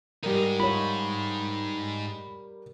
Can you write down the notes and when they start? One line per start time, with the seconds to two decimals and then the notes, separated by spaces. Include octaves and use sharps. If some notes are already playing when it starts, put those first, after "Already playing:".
0.23 G#2 G3 D#4 A#4
0.60 F4 C#5 B5